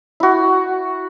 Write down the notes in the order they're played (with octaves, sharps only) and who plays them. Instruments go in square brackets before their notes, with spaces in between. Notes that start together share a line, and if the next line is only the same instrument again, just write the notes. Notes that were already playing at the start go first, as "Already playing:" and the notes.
[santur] E4 F#4